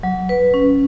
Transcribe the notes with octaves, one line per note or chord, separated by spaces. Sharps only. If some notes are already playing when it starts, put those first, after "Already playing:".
F#3
B4
C#4